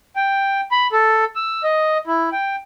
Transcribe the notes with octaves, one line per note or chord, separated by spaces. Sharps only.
G5
B5
A4
E6
D#5
E4
G5